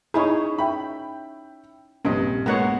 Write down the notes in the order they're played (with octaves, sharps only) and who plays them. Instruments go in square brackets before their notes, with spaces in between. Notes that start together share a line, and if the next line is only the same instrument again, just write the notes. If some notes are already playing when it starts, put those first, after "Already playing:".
[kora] C#4 D#4 E4 [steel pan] G#4 [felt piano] B5 C#6
[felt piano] E5 G5 [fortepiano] B5
[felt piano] A#1 C3 [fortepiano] G2 [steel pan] C#4 D#5
[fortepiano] G#3 A#3 B3 [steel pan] C#5 F#5 A#5